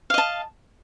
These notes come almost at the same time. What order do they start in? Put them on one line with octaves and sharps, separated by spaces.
F5 D#5 A5